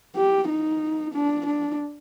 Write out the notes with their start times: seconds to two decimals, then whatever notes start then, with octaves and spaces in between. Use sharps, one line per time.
0.16 G4
0.49 D#4
1.14 D4
1.46 D4